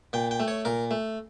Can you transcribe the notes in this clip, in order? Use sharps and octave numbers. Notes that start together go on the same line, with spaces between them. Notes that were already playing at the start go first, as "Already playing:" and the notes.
A#2 G5
G5
A3
C#5
A#2 A#4
A3